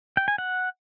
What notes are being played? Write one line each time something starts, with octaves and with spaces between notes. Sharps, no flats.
G5
G#5
F#5